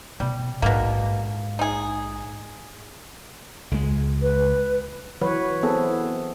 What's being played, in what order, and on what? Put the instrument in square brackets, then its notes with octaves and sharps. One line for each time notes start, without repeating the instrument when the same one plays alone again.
[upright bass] B2 [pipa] G3
[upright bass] A#1 G#2 [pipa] B2 A#3
[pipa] D#4 G#4
[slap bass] C#2 G#3
[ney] B4
[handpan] E3 F#3 B4 C#5
B3 C4 E4 G#4 A4